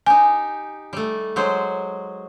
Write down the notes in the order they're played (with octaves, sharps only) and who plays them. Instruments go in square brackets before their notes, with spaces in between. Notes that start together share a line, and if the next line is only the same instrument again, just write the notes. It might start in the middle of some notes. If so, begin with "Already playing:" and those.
[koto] D#4 G4 [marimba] G#5
[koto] G3 A3
F#3 G#3 C5